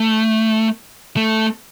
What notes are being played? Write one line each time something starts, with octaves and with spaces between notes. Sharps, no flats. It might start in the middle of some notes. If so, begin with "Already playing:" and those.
Already playing: A3
A3